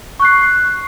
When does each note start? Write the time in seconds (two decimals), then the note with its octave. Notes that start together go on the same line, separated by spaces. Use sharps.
0.20 C#6
0.22 F#6
0.25 C7